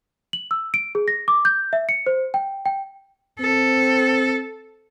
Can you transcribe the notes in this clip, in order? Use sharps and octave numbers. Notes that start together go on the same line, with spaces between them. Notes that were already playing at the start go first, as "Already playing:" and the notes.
F#7
E6
D7
G#4
A#6
D6
G6
E5
C#7
C5
G5
G5
C4 A4